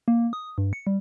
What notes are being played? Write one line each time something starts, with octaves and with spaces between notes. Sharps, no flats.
A#3
D#6
G2
C#7
G3